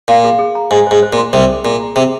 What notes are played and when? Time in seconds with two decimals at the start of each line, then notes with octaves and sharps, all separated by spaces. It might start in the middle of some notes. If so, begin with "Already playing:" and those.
0.08 A#2 F5
0.24 G#4
0.39 G#4
0.55 A#5
0.71 G#2 G#5
0.87 G#2 C5
1.03 C5
1.13 A#2
1.18 C6
1.33 C2 C3 D#5
1.50 G#4
1.64 A#2 G#4
1.80 A#5
1.96 C3 G#4